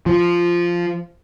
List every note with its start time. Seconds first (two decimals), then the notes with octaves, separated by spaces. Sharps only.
0.06 F3